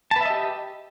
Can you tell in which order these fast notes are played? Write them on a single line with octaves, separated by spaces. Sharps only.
A5 B4 E5 D#5 G4